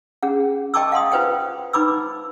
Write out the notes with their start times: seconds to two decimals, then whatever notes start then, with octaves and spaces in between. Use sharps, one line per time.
0.23 C#4 G#4 F#5
0.74 D#5 G5 A5 C#6 D6 E6
0.92 F5 F#5 C6 D#6
1.12 F4 B4 C5 F#5 G5
1.73 D#4 B4 B5 D6 E6